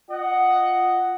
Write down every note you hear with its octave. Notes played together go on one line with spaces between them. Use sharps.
F4 D#5 F#5